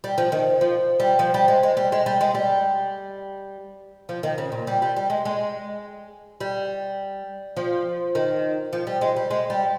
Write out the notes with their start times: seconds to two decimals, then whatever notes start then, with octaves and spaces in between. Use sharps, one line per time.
0.04 G3
0.18 F3
0.32 D#3
0.61 F3
1.00 G3
1.19 F3
1.34 G3
1.48 G#3
1.63 G#3
1.77 G3
1.92 G#3
2.06 G3
2.21 G#3
2.35 G3
4.09 F3
4.23 D#3
4.38 C#3
4.52 A#2
4.67 G3
4.82 G3
4.96 G3
5.10 G#3
5.25 G#3
6.41 G3
7.57 F3
8.15 D#3
8.73 F3
8.87 G3
9.01 G#3
9.16 G3
9.31 G#3
9.50 G3